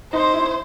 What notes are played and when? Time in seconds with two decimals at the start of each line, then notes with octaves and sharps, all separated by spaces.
0.13 D#4 C5
0.33 E4